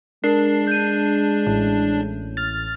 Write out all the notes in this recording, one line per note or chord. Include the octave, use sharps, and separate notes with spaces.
G#3 D4 A#4 C7
G6 D#7
A1
F6 A6